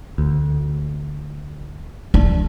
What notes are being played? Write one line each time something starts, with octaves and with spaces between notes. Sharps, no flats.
D2
D4